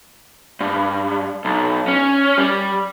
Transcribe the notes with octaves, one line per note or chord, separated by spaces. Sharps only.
G2
B1
C#4
G3